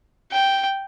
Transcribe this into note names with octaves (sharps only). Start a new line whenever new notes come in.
G5